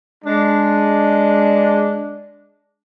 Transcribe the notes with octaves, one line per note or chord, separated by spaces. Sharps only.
G#3 D4